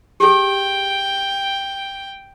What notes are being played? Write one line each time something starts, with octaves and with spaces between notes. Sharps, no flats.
G4 G#4 G5